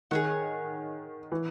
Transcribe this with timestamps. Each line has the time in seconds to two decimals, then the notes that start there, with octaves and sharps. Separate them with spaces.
0.11 D#3 G#4 C#5 F#5
1.32 E3